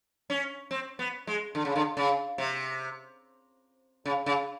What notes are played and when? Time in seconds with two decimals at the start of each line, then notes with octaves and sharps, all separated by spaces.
0.30 C#4
0.71 C4
0.99 B3
1.27 G#3
1.55 D3
1.65 C#3
1.75 D3
1.97 C#3
2.38 C3
4.05 C#3
4.26 C#3